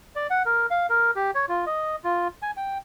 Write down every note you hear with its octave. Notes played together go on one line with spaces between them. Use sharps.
D5
F#5
A#4
F5
A#4
G4
C#5
F4
D#5
F4
G#5
G5